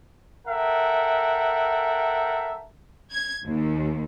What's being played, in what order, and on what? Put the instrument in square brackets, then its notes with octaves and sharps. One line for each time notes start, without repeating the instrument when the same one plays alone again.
[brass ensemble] A4 A#4 E5 F#5 G5
[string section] G#6
D#2